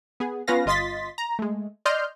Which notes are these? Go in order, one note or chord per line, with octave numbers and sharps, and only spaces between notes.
B3 G#4
B3 C#4 F4 B4 F5 A#6
G1 F4 D#5 C6 A6 B6
A#5
G#3 A3
D5 D#5 C6 F6 G6